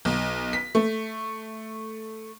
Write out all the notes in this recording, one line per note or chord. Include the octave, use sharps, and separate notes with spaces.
B1
B6
A3